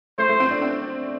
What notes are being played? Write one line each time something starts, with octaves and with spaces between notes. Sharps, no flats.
A3 C5
A3
C4
D4
C4